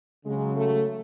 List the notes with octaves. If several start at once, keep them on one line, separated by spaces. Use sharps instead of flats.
C#3 F#3 G#3
A3